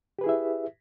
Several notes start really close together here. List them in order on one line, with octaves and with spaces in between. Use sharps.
G4 B4 G#4 E4 E5